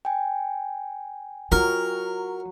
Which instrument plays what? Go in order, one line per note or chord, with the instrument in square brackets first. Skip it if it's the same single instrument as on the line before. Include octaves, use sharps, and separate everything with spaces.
[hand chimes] G5 G#5
[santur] F#3 [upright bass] F4 [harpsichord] A#4